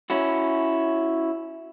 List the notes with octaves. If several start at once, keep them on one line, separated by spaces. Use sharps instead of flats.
C#4 E4 F#4